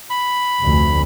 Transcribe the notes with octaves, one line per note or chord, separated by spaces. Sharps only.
B5
F1 D2